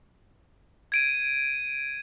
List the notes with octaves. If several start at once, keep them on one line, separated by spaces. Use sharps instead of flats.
G#6 D7 D#7